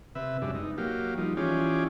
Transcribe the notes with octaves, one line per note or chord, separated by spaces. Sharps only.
C3 B4 E5
F#2 G3 G#3 D4
D#4
F#3 A#3 G4 F5
F3 G3 D#4
E3 C#4 F4 G4 G#4 D5